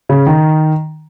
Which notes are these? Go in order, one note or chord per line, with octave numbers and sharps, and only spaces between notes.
C#3
D#3